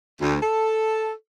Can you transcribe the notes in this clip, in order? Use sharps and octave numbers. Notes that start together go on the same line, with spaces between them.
D2
A4